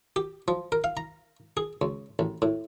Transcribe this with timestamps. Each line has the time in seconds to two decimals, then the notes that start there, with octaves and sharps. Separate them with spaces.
0.16 G4
0.48 F3
0.72 A#4
0.84 F5
0.97 A#5
1.57 G#4
1.81 C#2
2.19 A1
2.42 A2